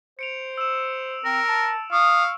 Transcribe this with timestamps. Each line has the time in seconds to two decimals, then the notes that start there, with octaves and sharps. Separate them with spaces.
0.19 C5 C#7 D7 F7
0.58 E6 E7
1.24 C4 A#4
1.48 A5
1.92 F5 C#6 D#6